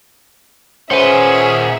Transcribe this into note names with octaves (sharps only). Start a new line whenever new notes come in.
A#2 C#4 G#4 B4 C5 E5 F#5